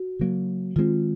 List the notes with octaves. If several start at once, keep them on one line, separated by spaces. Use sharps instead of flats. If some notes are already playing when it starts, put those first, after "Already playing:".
Already playing: F#4
C#3 F#3 A#3
D#3 G#3 C4 F4